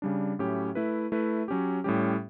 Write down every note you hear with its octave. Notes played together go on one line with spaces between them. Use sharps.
C#3 G3 D4
A2 F#3 C#4 E4 G4
A3 E4 B4
A3 E4 B4
F#3 C#4 G4
A2 G3 C#4 G4